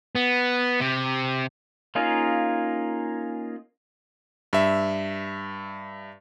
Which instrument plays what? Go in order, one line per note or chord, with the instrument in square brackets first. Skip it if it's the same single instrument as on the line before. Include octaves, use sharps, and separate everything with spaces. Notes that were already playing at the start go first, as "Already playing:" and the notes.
[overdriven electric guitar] B3
C3
[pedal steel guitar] A#3 C#4 D#4 F4 G#4
[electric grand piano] G2 E5